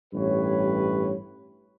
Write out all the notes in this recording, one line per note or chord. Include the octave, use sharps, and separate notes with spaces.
A1 G2 G4 B4 C#5